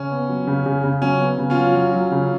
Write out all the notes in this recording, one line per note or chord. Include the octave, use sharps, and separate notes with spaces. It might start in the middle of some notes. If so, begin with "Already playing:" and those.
Already playing: C#3 C#4
B3
F#3
C#3
C#3
C#3
F#3 C#4
B3
C#3
C#4 F4
F#3
F#3
F#3
C#3